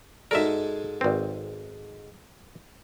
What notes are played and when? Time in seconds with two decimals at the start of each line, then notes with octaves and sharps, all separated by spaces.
0.31 G#2 G#3 D#4 F#4 A4 A#4 D5 E5
1.01 G#1 C4 B4 D5